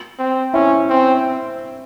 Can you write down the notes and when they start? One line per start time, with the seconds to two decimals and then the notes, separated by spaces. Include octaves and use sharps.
0.19 C4
0.54 C#4 E4
0.90 C4